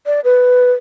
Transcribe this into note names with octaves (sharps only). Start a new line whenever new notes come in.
D5
B4